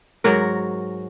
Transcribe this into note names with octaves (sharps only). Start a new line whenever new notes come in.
G#2 F#3 F#4 A#4